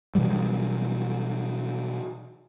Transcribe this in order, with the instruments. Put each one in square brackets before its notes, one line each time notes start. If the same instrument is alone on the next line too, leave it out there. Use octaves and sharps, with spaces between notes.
[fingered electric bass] B2 E3 F#3 G3